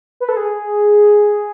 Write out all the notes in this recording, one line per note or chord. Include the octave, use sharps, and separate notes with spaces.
B4
A4
G#4